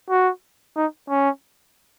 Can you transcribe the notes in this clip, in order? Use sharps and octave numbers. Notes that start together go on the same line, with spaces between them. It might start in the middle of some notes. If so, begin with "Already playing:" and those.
F#4
D#4
C#4